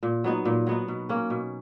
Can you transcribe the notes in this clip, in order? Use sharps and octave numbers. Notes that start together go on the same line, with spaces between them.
A#2
F#3 B3 D#4
A#2
F#3 B3 D#4
B2
A#3 C#4
B2